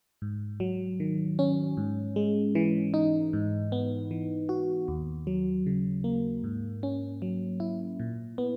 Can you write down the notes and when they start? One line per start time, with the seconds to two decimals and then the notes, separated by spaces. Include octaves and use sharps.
0.22 G#2
0.60 F#3
1.00 D#3
1.39 C#4
1.77 G#2
2.16 G#3
2.55 E3
2.94 D#4
3.33 G#2
3.72 B3
4.11 E3
4.49 F#4
4.88 D#2
5.27 F#3
5.66 C#3
6.04 A#3
6.44 G#2
6.83 C#4
7.22 F#3
7.60 E4
8.00 A#2
8.38 B3